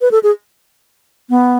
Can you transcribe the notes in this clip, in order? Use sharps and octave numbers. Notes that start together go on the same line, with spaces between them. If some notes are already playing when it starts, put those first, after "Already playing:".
B4
A4
G#4
B3